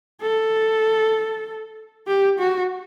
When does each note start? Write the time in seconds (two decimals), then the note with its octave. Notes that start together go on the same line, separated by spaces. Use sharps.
0.21 A4
2.07 G4
2.38 F#4